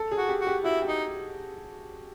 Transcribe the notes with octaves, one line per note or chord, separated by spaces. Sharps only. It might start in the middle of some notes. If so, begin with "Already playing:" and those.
Already playing: A4
G#4
F#4
G4
F#4
G4
E4 F#4
G4
D#4